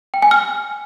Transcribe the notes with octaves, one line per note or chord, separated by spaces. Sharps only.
G5
G#5
F6